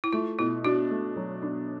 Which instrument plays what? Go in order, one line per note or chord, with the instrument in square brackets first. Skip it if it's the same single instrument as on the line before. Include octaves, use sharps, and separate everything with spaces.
[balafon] E4
[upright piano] A3 [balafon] F4
[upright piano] B2 [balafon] E4
[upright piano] D4 [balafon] F#4
[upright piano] A3
F#3
D4